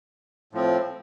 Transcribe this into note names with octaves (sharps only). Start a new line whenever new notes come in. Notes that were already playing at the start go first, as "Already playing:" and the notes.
A2 F3 C4